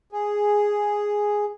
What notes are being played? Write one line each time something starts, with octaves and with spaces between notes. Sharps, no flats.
G#4